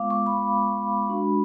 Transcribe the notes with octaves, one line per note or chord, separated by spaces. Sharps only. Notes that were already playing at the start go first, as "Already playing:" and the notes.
Already playing: G#3 B3 F4 F5 D6
C#6
B5
G#3 D4 F#4